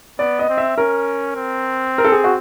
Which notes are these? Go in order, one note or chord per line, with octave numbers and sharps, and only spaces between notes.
B3 D5
D#5
C4
E5
C#4 A#4
C4
A#4
A4
G#4
F#4